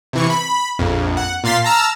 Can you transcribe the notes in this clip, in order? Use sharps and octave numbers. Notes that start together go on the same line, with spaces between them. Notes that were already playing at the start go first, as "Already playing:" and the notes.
C3 E3 C#6
B5
A#1 F2
F#5
A#2 F5 C6 A6 B6 C7
A5 A#5 E6 F6